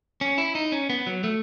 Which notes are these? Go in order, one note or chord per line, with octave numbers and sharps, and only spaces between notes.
C#4
E4
D#4
C#4
B3
F#3
A3